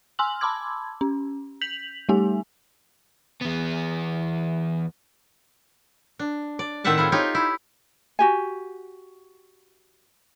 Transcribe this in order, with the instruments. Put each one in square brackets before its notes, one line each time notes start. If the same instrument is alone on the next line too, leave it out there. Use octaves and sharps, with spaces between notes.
[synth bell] G#5 C6 E6 F6 F#7
A5 B5 C6 D6 E6 G#6
C#4
G6 B6 F7 F#7
G3 A3 D#4 G4 G#5
[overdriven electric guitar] E2 B3
[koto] D4
D5
A2 D#3 C4 E5 F#5 A5
E4 F4 G#4
D#4 F4 G4 C#5
E4
[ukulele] F#4 G4 G#5